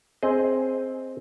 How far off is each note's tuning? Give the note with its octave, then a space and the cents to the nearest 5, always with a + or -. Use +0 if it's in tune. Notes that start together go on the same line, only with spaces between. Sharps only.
C4 +0 G#4 +5 D#5 +0